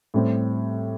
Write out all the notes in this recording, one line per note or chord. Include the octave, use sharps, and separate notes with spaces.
A2 G3 C4 G4